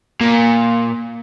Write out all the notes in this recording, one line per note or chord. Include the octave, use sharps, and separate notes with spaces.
A#2